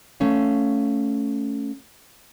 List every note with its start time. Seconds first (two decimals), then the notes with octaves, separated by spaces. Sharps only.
0.20 A3 C#4 F5